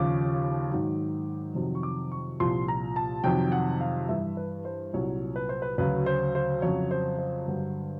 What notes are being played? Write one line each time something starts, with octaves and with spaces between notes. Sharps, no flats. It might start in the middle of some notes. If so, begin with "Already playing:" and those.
Already playing: D#2 C#3 F3 D6
G#2 D#3 F#3
F2 C3 D#3 F#3
C#6
D6
C#6
C2 A#2 F3 C6
A#5
A5
F2 C3 D#3 F#3 G5
F#5
F5
G2 E3 E5
B4
C5
C2 A#2 F#3 C#5
B4
C5
B4
D2 C#3 F#3 B4
C5
C5
F2 C#3 F#3 C#5
C5
C5
G2 D3 F#3